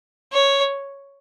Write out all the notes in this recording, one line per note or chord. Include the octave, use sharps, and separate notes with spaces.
C#5